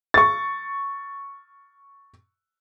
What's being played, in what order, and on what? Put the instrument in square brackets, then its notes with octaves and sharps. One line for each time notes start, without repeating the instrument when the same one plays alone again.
[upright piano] C#6 A6